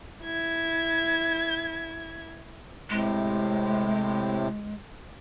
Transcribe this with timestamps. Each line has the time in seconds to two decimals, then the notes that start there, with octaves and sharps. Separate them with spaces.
0.23 E4 G#6
2.90 A2 C3 G#3